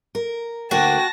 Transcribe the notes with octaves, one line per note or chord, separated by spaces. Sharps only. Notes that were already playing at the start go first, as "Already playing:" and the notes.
A#4
D2 A#3 F#4 G5 A5 A#6